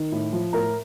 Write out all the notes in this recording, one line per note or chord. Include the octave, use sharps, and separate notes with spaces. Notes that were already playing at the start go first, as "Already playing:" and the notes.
Already playing: D#3
A2
F3
A2 A#4 A#5